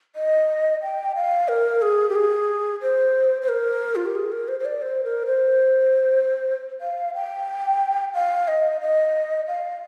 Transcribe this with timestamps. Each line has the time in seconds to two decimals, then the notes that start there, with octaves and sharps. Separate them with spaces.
0.16 D#5
0.82 G5
1.16 F5
1.48 A#4
1.82 G#4
2.09 G4
2.15 G#4
2.82 C5
3.41 C5
3.48 A#4
3.96 F4
4.06 G4
4.15 G#4
4.32 A#4
4.48 C5
4.59 C5
4.65 D5
4.82 C5
5.04 A#4
5.26 C5
6.81 F5
7.15 G5
8.14 F5
8.48 D#5
8.81 D#5
9.48 F5